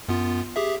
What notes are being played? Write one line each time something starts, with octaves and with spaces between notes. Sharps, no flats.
F#2 B3 F4
G4 G#4 E5